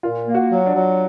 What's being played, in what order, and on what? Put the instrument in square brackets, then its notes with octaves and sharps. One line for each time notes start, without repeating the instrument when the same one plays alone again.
[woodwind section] A#2 [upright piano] F4
[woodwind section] A#3
[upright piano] F#4
[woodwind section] F#3
[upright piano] D4
[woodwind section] F#3